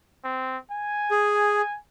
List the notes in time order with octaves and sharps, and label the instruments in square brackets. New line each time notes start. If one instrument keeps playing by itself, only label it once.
[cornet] C4
G#5
[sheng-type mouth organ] G#4